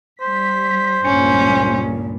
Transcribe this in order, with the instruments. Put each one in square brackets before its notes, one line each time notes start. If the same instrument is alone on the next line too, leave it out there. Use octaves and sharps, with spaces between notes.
[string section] G3 B6 [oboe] C5
[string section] C#2 G2 A#2 [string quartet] C#4